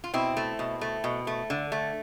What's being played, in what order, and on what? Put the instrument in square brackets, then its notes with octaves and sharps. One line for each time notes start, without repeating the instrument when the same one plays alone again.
[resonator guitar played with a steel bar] F4
B2 C4 E4
A3
B2
A3
B2
A3
D3
A3